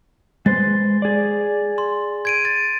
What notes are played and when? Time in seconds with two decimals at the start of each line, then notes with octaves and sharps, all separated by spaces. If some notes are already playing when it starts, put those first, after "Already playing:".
0.46 G#3 B4 C5 A6
1.02 G#4 D5
1.78 C6
2.25 G#6 D7 D#7
2.45 A6